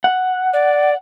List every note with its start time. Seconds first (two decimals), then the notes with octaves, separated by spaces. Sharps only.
0.04 F#5
0.53 D5